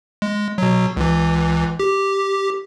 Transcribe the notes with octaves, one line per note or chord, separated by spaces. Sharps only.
G#3
B2 F#3
C#2 E3
G4